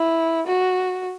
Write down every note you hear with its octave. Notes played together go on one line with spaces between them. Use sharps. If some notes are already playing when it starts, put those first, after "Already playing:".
Already playing: E4
F#4